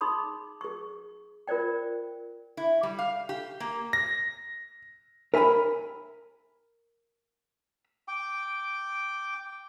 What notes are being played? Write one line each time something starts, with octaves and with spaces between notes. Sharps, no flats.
D#4 G#4 B5 C6 D6 D#6
G#4 C#6
F4 A#4 C5 D5 G5
E4
G3
F5
G4
A#3
A#6
A#4 E5 G#5 A#5 B5
G5 D6